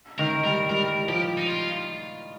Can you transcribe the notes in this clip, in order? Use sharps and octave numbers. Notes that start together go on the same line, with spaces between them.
D#3 A#4
G3 A#4
G3 A#4
F3 G4
D#4
F4